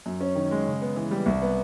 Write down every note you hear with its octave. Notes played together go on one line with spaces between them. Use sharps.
F#2
C#4
D#3
G#3
C#3
B3
E3
G3
C2
B3